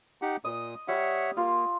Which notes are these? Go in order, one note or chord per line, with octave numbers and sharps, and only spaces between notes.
D#4 G4 F#5
A#2 D#5 D#6
G3 C#5 E5 F#5
A#3 F4